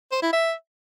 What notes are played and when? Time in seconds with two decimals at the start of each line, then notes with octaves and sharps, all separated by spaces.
0.12 C5
0.22 E4
0.33 E5